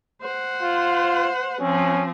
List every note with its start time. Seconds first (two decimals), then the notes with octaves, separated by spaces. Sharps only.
0.21 C5 F#5
0.63 F4
1.61 F3 C4 C#4